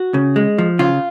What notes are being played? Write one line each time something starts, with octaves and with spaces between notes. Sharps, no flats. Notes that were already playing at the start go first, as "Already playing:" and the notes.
Already playing: F#4
C#3
G#3
F3
C#3 F4